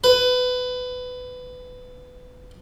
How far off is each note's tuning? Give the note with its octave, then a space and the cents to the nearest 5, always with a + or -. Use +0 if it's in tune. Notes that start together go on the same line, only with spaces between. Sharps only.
B4 +20